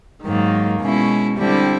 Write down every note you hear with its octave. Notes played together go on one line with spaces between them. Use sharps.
G#2 D#3 F#3 A#3
B2 G#3 C#4 E4
D3 G3 C4 E4